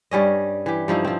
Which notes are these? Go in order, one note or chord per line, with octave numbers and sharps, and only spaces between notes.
G2 G3 C#4 D#5
E3 G4
G2 F3 D#4 E4
F3 C4